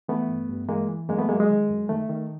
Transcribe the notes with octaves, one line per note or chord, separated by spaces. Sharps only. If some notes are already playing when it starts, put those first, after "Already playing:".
E3 A3 B3
G2
G2
E3 G#3 A#3
E3
F#2 G#3 A#3
A3 B3
F#3 G#3 A#3
G#3
D#3
F#2
D#3 A3
D#3